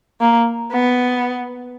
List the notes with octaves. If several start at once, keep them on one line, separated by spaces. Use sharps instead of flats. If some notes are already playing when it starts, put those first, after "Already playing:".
A#3
B3